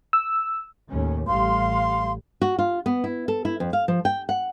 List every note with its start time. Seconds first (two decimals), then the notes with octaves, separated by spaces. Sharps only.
0.13 E6
0.90 D#2 A2 C#4
1.26 A1 G3 F5 C6
2.42 F#4
2.59 F4
2.86 B3
3.04 E4
3.28 A4
3.45 E4
3.60 F2
3.73 F5
3.88 F3
4.05 G5
4.29 F#5